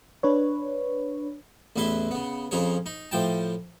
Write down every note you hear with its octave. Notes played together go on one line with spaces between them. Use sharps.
D4 B4 C#5
A1 E2 E4 B4 E5 C6
C#3 B3
F2 C#3 F3 G#4 C#5
D#4
A2 F3 G5 A5